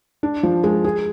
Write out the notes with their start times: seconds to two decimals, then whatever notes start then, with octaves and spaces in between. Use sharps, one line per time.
0.23 D4
0.43 F3
0.64 G#3
0.84 G#4